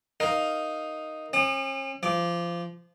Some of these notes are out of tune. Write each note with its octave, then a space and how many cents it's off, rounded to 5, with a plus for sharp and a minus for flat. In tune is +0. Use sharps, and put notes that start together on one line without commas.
D#4 +0 A#4 +0 F5 +5
C#4 -45 D#6 -45
F3 -20 D6 +0